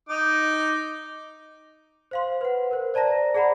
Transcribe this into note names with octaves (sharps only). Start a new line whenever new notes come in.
D#4 D6
C5 F5 C6
B4 F#5
A#4 C5
C5 D5 A5 A#5 A#6
G#4 D5 F#5 A#5 B5